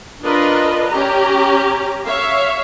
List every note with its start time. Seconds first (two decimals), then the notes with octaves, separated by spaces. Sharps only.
0.23 D4 F4 A#4 B4 D#5
0.89 C#4 G4 A#5
2.04 C#5 E5 F5